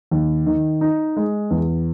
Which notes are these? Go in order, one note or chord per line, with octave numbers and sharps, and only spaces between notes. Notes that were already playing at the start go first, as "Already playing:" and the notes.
D#2
D#3
D#4
G#3
E2